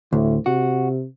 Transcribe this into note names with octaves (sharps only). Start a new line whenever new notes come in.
D2 A2
C3 F#4